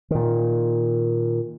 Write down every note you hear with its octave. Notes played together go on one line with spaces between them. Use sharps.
A#2 D#3